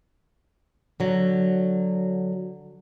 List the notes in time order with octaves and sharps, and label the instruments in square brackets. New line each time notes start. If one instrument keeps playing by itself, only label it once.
[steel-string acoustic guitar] D3 F#3